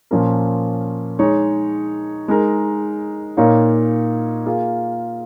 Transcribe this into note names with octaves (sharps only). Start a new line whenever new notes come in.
A#2 F3 C#4 A#4
G#3 D#4 C#5
G#3 D#4 A#4
A#2 A#3 D#4 C#5 F5
A#3 F4 G#4